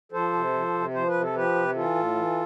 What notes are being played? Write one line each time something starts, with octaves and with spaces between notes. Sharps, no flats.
F3 A4 C5
C3
F3
C3
F3 C5
B4
C3
A4
F3 G4 B4
C3
E3 F4 A4
A2
E3